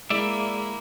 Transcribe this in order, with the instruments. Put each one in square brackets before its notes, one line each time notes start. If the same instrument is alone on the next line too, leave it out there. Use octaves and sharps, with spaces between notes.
[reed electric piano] G#3 G#4 [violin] A#3 E4 [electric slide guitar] D5 E5